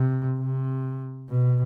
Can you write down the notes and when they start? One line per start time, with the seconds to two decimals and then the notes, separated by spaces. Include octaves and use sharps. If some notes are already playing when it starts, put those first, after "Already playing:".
Already playing: C3
0.38 C3
1.29 B2